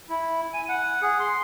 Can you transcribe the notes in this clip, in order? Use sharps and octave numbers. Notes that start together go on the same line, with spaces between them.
E4
G#5
F#5
G#4
C6